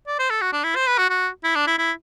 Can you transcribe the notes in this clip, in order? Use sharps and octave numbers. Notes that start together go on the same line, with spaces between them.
D5
C5
A4
F#4
D4
E4
C5
B4
F#4
F#4
E4
D4
E4
E4